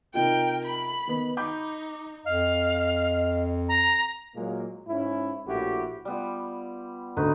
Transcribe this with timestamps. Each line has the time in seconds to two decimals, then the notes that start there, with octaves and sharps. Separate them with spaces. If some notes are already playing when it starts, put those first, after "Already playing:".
0.14 C3 D#4 F4 A#4 G5
0.65 B5
1.08 D#3 B3
1.37 D#4 B5 D6 G6
2.25 F2 D#5 F5
3.69 A#5
4.34 A#2 F#3 G#3 A#3
4.87 G#2 C#4 E4
5.46 A#1 A2 E4 F#4 G4
6.05 G3 B3 F4
7.17 D2 D#4 F#4 B4